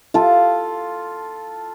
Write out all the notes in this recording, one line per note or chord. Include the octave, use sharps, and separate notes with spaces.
F4 A4